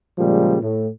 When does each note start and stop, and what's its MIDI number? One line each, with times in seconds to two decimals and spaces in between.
0.19 0.58 46
0.19 0.58 49
0.19 0.58 53
0.19 0.58 55
0.19 0.58 56
0.62 0.89 45